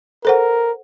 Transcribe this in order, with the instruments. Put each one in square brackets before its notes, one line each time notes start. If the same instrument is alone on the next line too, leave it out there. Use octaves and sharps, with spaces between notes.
[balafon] A4 C5 F#5 [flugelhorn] A#4